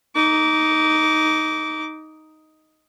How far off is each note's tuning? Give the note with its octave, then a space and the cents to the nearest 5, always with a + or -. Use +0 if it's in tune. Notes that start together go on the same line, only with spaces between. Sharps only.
D#4 +5 D6 -20